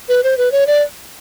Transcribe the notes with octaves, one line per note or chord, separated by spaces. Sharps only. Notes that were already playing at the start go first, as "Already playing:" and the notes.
B4
C5
B4
C#5
D5